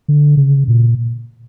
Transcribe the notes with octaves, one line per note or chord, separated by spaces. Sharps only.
D3
C#3
A#2